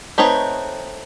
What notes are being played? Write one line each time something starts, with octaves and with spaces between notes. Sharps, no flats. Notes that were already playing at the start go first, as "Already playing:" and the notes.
A3 C4 D#4 B4 C#5